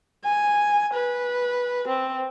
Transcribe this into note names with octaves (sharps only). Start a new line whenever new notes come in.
G#5
B4
C4